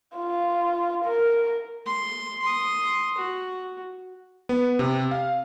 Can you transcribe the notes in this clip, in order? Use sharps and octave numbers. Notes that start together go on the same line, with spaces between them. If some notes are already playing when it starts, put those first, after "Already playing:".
F4
A#4
C6
C6 D#6
F#4
B3
C3
F5